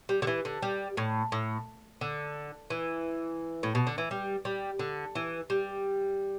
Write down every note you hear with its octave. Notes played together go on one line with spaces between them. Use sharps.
G3
D3
E3
D3
G3
A2
A2
D3
E3
A2
B2
D3
E3
G3
G3
D3
E3
G3